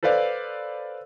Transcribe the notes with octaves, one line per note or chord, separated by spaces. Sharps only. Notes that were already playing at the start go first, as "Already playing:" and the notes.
A4 B4 C5 D5 F5